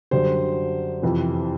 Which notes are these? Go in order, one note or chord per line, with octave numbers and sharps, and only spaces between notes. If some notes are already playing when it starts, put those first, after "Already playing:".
F#2 D3 G3 C5
F2 C3 E3